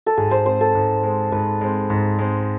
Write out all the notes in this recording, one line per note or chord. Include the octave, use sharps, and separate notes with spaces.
A4
G#2 G#4
C5
G#3 C4 C5
A4
G#2
G#3 C4
G#2 B4
G#3 C4
G#2
G#3 C4